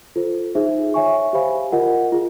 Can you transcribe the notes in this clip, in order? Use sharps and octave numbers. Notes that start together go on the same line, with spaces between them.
F4 A4 C5
D#4 G#4 C5 E5
C#5 E5 G#5 C#6
G4 C5 F5 G#5 B5
F4 A#4 D#5 F#5
F4 G#4